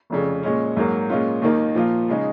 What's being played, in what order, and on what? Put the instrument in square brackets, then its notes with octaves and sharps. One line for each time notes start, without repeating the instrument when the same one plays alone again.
[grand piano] F1 F2 C#3
A#2 G#3 C#4
G#2 F#3 A#3
A#2 G#3 C#4 F4
D#2 D#3 A#3 D#4
A#2 F3 A#3 F4
C#3 G#3 D#4